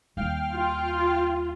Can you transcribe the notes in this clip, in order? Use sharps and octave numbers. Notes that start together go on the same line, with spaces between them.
D#2 G3 F5 G5 F6
F4